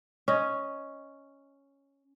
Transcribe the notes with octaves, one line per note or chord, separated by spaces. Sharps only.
C#4 D#5